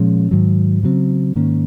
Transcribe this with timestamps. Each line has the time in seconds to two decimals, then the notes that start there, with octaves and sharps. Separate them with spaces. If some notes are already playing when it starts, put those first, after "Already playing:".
Already playing: A#2 F3 G#3 C#4
0.31 G#2 D#3 F#3
0.83 C#3 F#3 C4
1.35 G#2 D#3 A#3 C#4